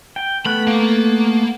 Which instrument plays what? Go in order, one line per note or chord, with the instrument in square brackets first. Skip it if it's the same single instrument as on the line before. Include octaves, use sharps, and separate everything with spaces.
[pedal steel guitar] G5
[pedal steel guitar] A3 B3 F#6 [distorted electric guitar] B5
[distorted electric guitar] A#3